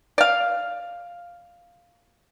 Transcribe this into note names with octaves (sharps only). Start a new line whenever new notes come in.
D5 F5